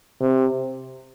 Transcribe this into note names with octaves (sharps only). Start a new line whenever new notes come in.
C3